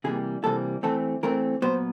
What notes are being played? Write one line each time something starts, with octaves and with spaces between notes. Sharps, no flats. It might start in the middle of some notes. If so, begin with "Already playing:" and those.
C3 E3 G3 A#3 G#4
C3 E3 G3 A#3 A4
E3 A3 C4 A4
E3 A3 C4 A#4
A#2 F#3 B3 C5